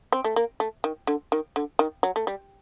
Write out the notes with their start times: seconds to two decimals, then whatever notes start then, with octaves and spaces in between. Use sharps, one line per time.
0.12 C4
0.24 A3
0.36 A#3
0.60 A3
0.84 D#3
1.07 D3
1.32 D#3
1.56 D3
1.79 D#3
2.03 F#3
2.16 A3
2.27 G3